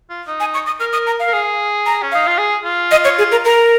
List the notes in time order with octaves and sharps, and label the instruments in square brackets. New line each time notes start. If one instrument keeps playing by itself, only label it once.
[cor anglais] F4
D#4
[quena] G#5
C#6
D#6
[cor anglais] A#4 [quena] F6
[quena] D#6
A#5
F5
[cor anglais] A#4
G#4
[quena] A#5
[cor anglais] C#4
[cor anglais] D#4 [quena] F5
[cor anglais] F4
G#4
F4
[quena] D#5
C#5
G#4
A#4
A#4